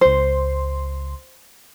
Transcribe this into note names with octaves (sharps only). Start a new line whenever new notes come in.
C#2 C5 C6